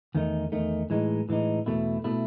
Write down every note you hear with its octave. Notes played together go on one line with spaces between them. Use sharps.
E2 D#3 A3 D#4
E2 D#3 A3 D#4
A2 E3 G#3 D#4
A2 E3 G#3 D#4
E2 B2 A3 E4
B2 A3 E4